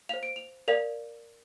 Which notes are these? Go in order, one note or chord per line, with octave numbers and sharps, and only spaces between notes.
C5 F5 F7
D7
F7
A#4 D5 F5 F7